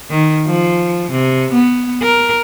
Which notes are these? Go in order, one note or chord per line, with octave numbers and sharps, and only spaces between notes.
D#3
F3
C3
B3
A#4